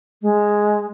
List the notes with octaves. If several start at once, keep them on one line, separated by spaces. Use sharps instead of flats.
G#3